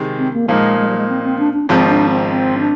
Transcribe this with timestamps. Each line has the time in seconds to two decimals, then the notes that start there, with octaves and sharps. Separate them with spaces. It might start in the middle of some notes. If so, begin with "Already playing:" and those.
Already playing: C3 D#3 G#3
0.18 C4
0.33 A#3
0.48 A#2 F3 G#3 A#3 D#4
0.79 G#3
0.88 G3
0.97 G#3
1.09 C4
1.24 C4
1.39 D4
1.53 D4
1.69 G#1 G#2 F3 C4
1.88 D4
2.09 C4
2.29 C4
2.59 D4